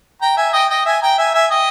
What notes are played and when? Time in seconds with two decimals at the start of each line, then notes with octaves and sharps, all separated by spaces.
0.22 G5 A#5
0.37 E5 G#5
0.53 D#5 G5
0.70 D#5 G5
0.86 E5 G#5
1.02 G5 A#5
1.18 E5 G#5
1.34 E5 G#5
1.51 D#5 G5